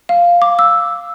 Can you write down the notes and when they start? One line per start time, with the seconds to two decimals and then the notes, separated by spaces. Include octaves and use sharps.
0.09 F5
0.42 D6
0.59 E6